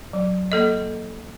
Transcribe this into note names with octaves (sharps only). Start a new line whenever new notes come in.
F#3
A#3 A4 D#5